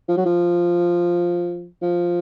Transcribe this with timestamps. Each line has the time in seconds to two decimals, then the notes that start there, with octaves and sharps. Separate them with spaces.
0.08 F3
0.17 F#3
0.25 F3
1.82 F3